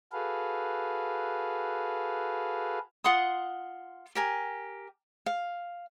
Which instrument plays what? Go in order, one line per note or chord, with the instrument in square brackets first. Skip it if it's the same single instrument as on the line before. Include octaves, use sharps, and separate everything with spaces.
[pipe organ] F#4 G#4 A4 B4 F5
[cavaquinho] F4 F#5 C6 D#6
G4 A#4 G#5
F5